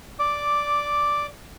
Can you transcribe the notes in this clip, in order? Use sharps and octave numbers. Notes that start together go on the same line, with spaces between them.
D5 D6